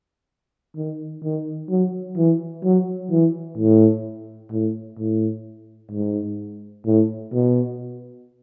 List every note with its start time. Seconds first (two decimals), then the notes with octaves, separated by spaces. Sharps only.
0.77 D#3
1.23 D#3
1.70 F#3
2.17 E3
2.64 F#3
3.11 E3
3.58 A2
4.52 A2
4.99 A2
5.91 G#2
6.85 A2
7.33 B2